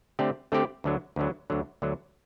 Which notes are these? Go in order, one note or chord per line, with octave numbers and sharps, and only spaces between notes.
D3 A3 C4 G4 D5
D3 A3 C4 G4 D5
D2 D3 F#3
D2 D3 F#3
D2 D3 F#3
D2 D3 F#3